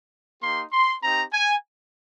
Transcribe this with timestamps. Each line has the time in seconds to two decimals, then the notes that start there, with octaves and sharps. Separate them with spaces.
0.42 A#3 D#4 G4 C6
0.73 C6
1.03 C4 D#4 G4 A#5
1.33 G#5